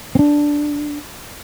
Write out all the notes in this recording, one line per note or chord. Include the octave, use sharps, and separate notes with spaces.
C4 D4